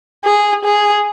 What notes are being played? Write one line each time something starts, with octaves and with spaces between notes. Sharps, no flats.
G#4
G#4